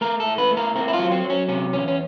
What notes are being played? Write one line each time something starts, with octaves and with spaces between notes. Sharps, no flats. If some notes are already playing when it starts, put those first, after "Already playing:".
A3 A#4
A4
A2
B4
A3
A#4
C4 A#4
E4
F4
F#3
C4
F#3
C#4
C3 C#4
E2 C#4
C#4